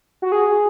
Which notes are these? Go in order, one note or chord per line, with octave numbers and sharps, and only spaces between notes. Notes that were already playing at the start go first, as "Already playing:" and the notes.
F#4
G#4